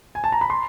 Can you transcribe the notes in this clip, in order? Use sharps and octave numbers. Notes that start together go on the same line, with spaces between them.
G#5
A5
A#5
B5
C6